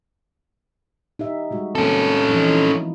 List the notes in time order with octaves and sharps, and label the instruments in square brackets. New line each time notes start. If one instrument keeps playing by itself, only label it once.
[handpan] D#4 G4 E5
G3 G#3 F#4
[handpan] A#3 C4 [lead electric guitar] C#4 A4
[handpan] E3 F3 D#4
E4